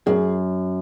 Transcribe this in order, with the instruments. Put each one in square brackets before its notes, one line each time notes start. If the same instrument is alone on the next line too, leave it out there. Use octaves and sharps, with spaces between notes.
[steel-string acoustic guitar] F#2 [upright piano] G#4